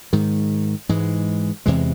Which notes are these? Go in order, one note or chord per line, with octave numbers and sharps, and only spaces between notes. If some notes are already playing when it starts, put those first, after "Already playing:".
G#2 D#3 G#3
G#2 E3 G#3
E2 C3 E3 G#3